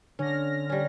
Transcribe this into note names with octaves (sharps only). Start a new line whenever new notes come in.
D3 C#4 F6 A#6
G3 C#4